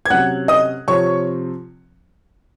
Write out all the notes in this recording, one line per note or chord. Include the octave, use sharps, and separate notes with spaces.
G#6
C3 F#3 C#4 F#5 F#6
D#5 D#6
C3 F3 C4 C#5 C#6